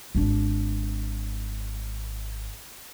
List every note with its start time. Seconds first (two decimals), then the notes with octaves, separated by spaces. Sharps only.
0.15 G#1 D4